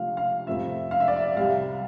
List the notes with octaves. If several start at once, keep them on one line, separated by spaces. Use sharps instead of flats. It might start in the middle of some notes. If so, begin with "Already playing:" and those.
Already playing: C3 F3 A3 D4 F4 F5
F5
F2 C3 F3 A3 C4 E5
F5
E5
D5
E5
C2 C3 G3 F5